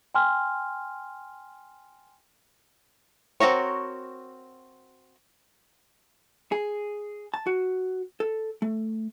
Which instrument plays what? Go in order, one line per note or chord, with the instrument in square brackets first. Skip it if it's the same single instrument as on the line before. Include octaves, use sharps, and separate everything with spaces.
[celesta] G5 G#5 C6 F6
[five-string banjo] C4 F#4 A#4 C#5
[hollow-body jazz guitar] G#4
A5
F#4
A4
A3